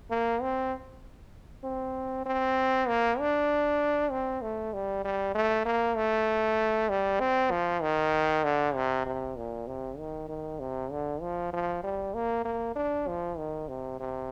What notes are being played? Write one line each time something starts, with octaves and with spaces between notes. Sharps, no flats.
A#3
C4
C4
C4
A#3
D4
C4
A3
G3
G3
A3
A#3
A3
G3
C4
F3
D#3
D3
C3
C3
A#2
C3
D#3
D#3
C3
D3
F3
F3
G3
A#3
A#3
D4
F3
D#3
C3
C3